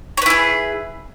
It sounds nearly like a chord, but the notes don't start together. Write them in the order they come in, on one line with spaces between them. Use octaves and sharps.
C#5 B4 E4 G#4